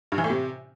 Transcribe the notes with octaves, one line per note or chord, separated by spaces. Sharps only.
G2
E3
A2
C3